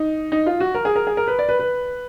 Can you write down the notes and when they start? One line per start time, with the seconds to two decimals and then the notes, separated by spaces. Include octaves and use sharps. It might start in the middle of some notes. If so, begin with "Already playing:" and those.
Already playing: D#4
0.32 D#4
0.46 F4
0.60 F#4
0.75 A#4
0.85 G#4
0.96 A#4
1.07 G#4
1.17 A#4
1.27 B4
1.39 D5
1.49 B4
1.60 B4